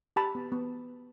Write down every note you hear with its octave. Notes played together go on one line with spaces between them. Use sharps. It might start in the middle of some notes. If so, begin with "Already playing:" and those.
G4 A5 B5
B3
B3